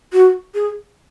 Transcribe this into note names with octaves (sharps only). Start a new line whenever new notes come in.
F#4
G#4